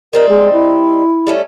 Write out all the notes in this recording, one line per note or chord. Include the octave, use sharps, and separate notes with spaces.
G3 C4 D#4 A#4
G#3
E4
G3 A3 C#4